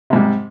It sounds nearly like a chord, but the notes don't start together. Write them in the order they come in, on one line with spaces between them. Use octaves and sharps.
C3 G#2 G3